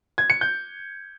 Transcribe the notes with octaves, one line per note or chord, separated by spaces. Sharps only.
G#6
C#7
G6